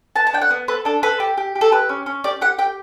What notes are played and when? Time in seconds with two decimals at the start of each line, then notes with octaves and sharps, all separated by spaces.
0.16 B3 A5
0.27 A5
0.33 D4 G5
0.42 F#5
0.51 B3
0.68 A4 B4
0.85 D4 A4
1.03 A4 B4
1.20 G4
1.38 G4
1.55 G4
1.61 A4
1.72 G4 B4
1.89 C#4
2.06 C#4
2.24 G4 D5
2.41 G4 F#5
2.58 G4 G5